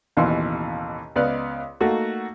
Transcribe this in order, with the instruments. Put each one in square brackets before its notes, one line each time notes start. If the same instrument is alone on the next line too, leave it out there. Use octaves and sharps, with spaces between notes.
[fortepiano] A1 D#2 B2 E3 F5 C6
C#2 B3 D5 D#5 F5 F#6
A3 A#3 D#4 F#4 A4